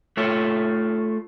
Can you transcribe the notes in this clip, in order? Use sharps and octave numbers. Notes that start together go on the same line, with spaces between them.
A3 F4 A4 C#5